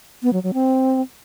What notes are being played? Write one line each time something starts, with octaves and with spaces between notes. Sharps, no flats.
B3
F#3
F#3
C4